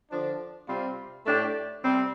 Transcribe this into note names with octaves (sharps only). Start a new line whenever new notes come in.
D3 F3 D4
C3 G3 C4 F4
A2 A3 D4 G4
C3 G3 C4